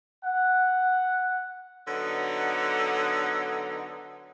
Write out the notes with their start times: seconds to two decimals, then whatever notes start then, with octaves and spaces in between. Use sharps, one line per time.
0.25 F#5
1.87 D3 F#3 B3 D#4